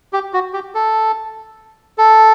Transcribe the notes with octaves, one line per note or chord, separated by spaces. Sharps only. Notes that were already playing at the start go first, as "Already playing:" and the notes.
G4
F#4
G4
A4
A4